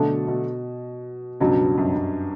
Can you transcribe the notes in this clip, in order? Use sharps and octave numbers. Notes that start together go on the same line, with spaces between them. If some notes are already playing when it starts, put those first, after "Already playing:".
Already playing: B2 D3 F#3 A3 D4 A4
B2
C#2 G2 B2 F#3
F#2
F#2